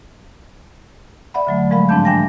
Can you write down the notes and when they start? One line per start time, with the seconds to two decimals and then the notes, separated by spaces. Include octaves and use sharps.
1.34 D5 E5 F#5 B5
1.47 D3 F#3 A3
1.70 A2 F3 G#3 A#4 F5 B5
1.89 G#2 F3 C4 D4 A5 G6
2.05 E3 D4 G5 G#5 A#6